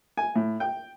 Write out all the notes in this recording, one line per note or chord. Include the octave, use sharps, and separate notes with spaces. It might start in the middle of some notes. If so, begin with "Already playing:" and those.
G#5
A2
G5